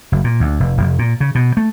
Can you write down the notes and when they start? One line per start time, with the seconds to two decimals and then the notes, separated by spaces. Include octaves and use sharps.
0.12 F#1
0.24 A#2
0.40 D2
0.60 F1
0.78 F1
0.99 A#2
1.20 C#3
1.35 B2
1.57 A3